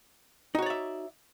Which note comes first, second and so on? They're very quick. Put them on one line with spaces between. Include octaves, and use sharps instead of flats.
D#4 F#4 C#5 D5 E5